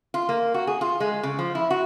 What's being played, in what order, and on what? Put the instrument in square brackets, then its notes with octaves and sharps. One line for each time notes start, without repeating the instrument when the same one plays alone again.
[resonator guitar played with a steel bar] F4
A#3
F#4
G#4
F4
G#3
C#3
F3
E4
F#4